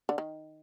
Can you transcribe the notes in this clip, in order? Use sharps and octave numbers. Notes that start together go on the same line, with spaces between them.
D3
D#3